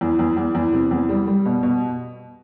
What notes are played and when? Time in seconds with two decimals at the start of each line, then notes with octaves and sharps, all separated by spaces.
0.01 E2
0.19 E2
0.37 E2
0.55 E2
0.73 C3
0.91 E2
1.09 G3
1.27 G3
1.45 B2
1.63 B2